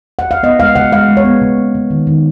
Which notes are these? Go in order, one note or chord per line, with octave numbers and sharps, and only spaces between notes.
F#5
F5
B3 D#5
G#3 F5
C#3 F#5
G#3 F5
G#3
C#5
B3
C#3
A#3
C#3
D#3
D#3